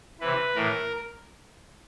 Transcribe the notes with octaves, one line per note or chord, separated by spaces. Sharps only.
C3 E3 B4
A2 E3 A#4